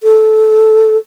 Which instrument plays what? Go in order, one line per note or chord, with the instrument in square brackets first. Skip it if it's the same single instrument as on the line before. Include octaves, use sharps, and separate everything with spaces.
[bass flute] A4